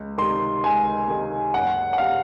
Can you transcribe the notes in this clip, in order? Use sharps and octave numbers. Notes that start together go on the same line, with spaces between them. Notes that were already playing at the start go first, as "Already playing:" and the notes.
Already playing: C#2
C3 D#3 C6
C#2 G#5
C3 D#3
F#1 F#5
F#5
C3 F5